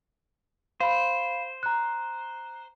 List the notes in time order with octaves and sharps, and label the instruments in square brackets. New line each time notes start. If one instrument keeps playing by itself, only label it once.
[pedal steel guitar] C5 [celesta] F5 B5
[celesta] A#5 F#6